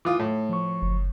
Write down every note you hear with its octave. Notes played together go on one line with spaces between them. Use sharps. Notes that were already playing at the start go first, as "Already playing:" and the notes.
E3 F4 D6 D#6
A2 A3
F3 C#6
F#1